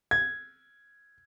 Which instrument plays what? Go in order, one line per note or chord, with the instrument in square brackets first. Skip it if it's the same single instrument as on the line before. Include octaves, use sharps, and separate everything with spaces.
[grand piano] G#6